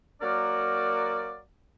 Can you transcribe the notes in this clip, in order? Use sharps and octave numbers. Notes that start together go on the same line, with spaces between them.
F#3 A#3 F#4 A#4 D5